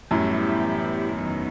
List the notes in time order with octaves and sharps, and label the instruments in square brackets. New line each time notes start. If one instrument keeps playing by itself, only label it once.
[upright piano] F#2 A2 [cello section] E3 G3 B3 E4 G4
[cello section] E2 D#3 F#3 B3 D#4